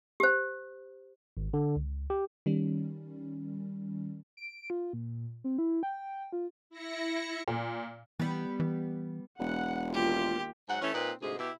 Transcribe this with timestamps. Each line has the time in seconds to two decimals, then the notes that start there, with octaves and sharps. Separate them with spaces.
0.20 G4 C5
1.37 G#1
1.54 D3
1.76 C#2
2.10 G4
2.46 D#3 G3 C#4
4.37 D7
4.70 F4
4.93 A#2
5.44 C4
5.58 E4
5.83 G5
6.33 F4
6.70 E4 A#6 C#7
7.48 A#2
8.20 E3 G3 B3
8.60 E3
9.40 E1 F#5
9.94 D#3 A#3 F4 G4
10.69 G#2 F#3 F#5
10.81 E3 A3 C#4
10.93 A#2 C4 D#4 B4
11.21 D2 G#2 C3 G#4
11.38 B2 E4 G4